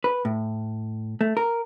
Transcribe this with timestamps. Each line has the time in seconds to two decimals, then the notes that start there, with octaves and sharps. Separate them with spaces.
0.04 B4
0.25 A2
1.21 A3
1.37 A#4